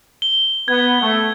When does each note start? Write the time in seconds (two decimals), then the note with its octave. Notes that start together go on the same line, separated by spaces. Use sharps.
0.22 G7
0.68 B3 G#6
1.02 A3